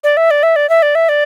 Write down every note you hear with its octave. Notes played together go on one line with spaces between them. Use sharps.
D5
E5
D5
E5
D5
E5
D5
E5
D5